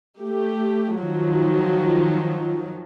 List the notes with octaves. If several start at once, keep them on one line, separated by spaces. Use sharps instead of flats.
A3 G4
D#3 F3 F#3